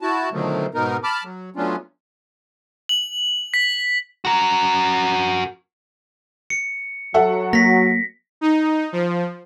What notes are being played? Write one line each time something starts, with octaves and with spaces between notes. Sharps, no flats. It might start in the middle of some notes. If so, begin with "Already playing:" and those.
E4 F#4 A5
B2 D3 D#3 F3 F#3 A3
G#2 B2 B3 D#4 A#4
A5 B5 D6 F6
F#3
F#3 A3 B3 C#4 D4 F4
F#7
B6
F#4 A#4
C#7
F#3 A4 E5 F#5
A#3 A#6 B6
D#4
F3